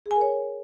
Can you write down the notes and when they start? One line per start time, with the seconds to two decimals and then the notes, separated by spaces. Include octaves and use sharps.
0.06 G#4
0.11 G#5
0.16 A#4
0.21 C#5